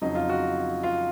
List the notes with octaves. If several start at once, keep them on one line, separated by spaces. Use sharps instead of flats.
F2 C#3 F#3 D#4
F4
F#4
F4